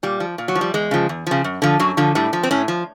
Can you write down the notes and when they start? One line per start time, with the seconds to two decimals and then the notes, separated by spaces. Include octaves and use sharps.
0.03 A#2 G3
0.20 F3
0.38 A#2
0.48 F#3
0.55 F3
0.61 G3
0.74 E2 G#3
0.91 C#3 F3
1.09 E2
1.27 C#3 F3
1.44 F#2
1.62 D3 F3
1.80 F#2 F#3
1.97 D3 F3
2.15 A2 G3
2.33 F3
2.43 C4
2.51 A2 C#4
2.68 F3